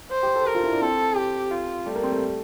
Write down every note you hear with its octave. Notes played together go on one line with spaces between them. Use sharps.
C5
G4
A4
G4 A#4
F4
E4
D4
C4 A4
G4
F4
G3 A3
A#3
C4
A3